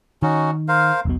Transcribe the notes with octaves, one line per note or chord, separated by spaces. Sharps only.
D#3 C#4 D#4 F#4
A#4 C5 F5
E1 B1 B2